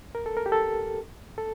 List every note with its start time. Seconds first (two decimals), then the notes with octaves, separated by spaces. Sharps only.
0.15 A#4
0.26 A4
0.37 A#4
0.46 G4
0.52 A4
1.38 A4